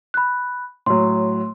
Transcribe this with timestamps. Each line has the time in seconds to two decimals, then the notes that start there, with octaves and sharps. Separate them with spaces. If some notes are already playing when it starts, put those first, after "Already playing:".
0.14 B5 F#6
0.86 A2 F#3 C6